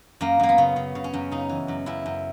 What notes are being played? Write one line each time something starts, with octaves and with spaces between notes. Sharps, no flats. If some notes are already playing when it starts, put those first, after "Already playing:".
F#2 A#3
F#2 A#3
B3
C#3
C#3
C#3
C#4
F#2
C#3 D#4
E3
F#2
F#2 E4
F#2